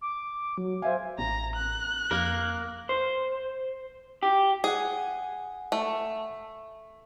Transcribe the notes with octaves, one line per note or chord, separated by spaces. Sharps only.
D6
F#3
C5 E5 F5 G#5
A1 A#5
F#6
F2 A#3 A#4
C5
G4
G#4 F#5 G#5
A3